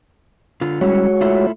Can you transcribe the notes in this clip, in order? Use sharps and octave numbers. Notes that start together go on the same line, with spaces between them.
D3 F4
G3 G#3 C#4 E4 F#4 C#5
A3 E4 F4